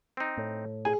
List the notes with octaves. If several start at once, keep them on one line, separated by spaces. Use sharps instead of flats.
C4 D#4
A2
G#4 G#5